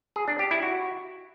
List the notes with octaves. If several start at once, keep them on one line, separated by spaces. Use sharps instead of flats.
G#4
D4
G4
E4
F#4